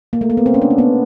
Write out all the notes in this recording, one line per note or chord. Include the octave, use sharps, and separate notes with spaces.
A#3
A3
A#3
B3
C4
C#4
D4
C#4
B3